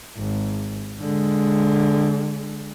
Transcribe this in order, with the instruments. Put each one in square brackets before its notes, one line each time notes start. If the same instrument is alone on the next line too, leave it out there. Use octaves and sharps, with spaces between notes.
[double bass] G#1
D3 G#3